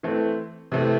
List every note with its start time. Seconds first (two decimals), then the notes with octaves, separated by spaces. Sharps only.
0.03 E3 A3 C4
0.72 C3 E3 A3 C4